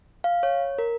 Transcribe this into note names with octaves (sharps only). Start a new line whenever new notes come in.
F5
C#5
A#4